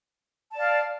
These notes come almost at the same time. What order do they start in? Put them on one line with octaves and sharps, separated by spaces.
A5 D5 F5 F6